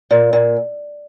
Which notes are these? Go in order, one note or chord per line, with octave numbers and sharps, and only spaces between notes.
A#2
A#2